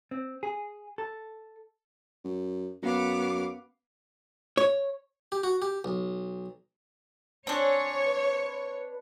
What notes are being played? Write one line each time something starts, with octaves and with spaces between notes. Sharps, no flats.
C4
G#4
A4
F#2
F#2 B3 F5 D6
C#5
G4
F#4
G4
B1
C4 D4 C#5 G#5
B4